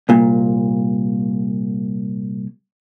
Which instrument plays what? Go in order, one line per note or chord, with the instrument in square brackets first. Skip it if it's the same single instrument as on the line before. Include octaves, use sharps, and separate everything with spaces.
[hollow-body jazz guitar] C2 A#2